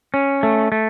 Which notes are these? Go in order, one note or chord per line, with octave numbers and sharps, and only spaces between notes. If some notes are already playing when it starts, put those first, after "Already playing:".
C#4
A3
A3